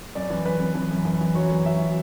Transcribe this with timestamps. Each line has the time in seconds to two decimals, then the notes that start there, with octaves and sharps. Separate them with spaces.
0.15 F#2 D5
0.30 E3
0.45 F#2 B4
0.60 F#2
0.75 E3
0.91 F#2
1.05 E3
1.21 E3
1.35 F#3 C#5
1.51 F#2
1.66 F#3 E5
1.81 F#3